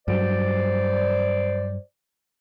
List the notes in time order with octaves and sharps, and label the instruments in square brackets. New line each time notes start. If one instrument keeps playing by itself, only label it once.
[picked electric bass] G2 F#3 [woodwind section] C5 D5